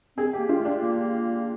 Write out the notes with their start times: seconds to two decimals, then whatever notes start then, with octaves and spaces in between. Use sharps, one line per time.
0.17 C4 G#4
0.33 G4
0.38 A#3
0.49 F4
0.60 A3
0.65 D4
0.81 A#3